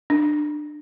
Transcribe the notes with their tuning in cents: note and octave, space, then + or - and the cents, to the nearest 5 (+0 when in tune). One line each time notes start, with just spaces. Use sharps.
D4 +25